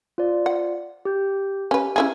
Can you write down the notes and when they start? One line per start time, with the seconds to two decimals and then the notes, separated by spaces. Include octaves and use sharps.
0.18 F4 C5 D5
0.46 F#5
1.05 G4 G6
1.71 C#4 G4 B4
1.96 C#4 E4 G#4